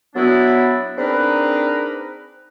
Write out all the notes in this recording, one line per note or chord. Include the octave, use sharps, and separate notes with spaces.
F#3 B3 D4 E4
C4 D4 D#4 G#4 A#4 B4